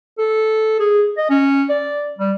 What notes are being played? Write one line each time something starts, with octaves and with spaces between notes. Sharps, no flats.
A4
G#4
D#5
C#4
D5
G3